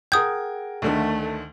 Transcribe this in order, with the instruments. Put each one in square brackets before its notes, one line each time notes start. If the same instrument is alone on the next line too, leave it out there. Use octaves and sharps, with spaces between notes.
[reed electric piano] G#4 F#5 G5 [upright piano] A#4 G#6 [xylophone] D#6 G6
[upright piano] D2 D3 D#3 [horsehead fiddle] A3